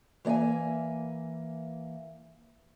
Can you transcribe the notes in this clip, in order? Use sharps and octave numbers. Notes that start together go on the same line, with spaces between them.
E3 A#3 D5 E5 G#5